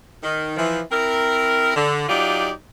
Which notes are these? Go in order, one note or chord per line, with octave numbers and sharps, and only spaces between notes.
D#3
E3 F3
C4 E4 A#4
D3
F#3 D#4 F4 G4 D5